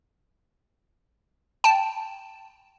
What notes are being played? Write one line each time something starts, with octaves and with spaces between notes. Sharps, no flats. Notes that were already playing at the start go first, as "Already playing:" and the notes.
G5 A5